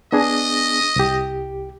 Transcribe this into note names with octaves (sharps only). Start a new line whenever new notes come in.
B3 D4 G#4 D#5
C2 G4